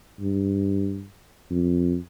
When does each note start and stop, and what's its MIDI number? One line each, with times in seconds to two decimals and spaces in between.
0.20 1.05 43
1.50 1.96 41